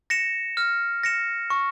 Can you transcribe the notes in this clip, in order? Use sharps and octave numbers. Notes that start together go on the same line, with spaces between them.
A#6 C#7 E7
F6
A#6 C#7 E7
C#6